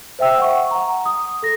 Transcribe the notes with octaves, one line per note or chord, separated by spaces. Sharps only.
C5 E5 G5 E6
F#5 C#6
F#5 A#5
D#6
A4 A#6